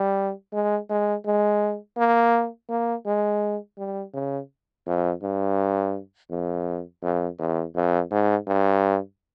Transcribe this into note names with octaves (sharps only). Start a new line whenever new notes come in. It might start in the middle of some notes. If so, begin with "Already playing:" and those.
Already playing: G3
G#3
G#3
G#3
A#3
A#3
G#3
G3
C#3
F2
G2
F2
F2
E2
F2
G#2
G2